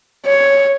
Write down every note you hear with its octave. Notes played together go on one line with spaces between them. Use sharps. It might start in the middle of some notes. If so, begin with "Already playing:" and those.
C#5